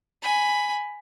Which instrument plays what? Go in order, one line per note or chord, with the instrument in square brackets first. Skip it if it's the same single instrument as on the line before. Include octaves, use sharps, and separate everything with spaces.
[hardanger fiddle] G#5 B5